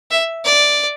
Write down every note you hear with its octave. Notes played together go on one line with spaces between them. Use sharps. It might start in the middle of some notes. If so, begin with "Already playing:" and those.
E5
D5